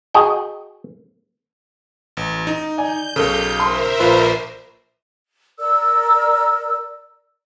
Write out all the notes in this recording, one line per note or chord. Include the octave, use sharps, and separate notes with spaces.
F#4 G#4 D#5 G5
A1
D#4
D5 G#5 G6
B1 C#3 A4 A#4
A#4 C5 E5 C6
A#1 F4 B4 B5
A#4 D5 E6